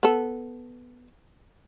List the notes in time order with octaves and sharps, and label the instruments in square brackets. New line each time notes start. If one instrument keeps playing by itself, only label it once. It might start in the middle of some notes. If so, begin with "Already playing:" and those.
[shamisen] B3 A4